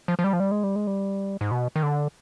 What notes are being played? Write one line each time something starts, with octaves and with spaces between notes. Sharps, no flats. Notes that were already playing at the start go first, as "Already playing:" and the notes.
F3
F3
G3
F3
G3
G#3
G3
G#3
G3
G#2
B2
D#3
D3